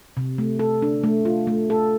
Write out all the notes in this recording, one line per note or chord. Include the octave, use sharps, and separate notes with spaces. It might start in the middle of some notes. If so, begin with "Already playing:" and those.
C3
A3
A4
D4
A3
F4
A3
A4